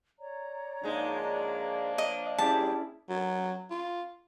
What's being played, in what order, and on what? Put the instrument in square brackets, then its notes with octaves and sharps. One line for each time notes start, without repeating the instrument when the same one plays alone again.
[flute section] C#5 D5 A#5
[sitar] G#2 G#3 D#4 [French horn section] F3 A#3 D4
[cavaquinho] D#5
[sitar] G3 G4 [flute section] C#4 E4 G#4 [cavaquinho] A5
[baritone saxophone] F#3
F4